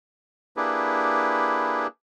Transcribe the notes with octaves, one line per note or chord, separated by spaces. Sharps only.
A#3 D4 E4 G4 G#4 B4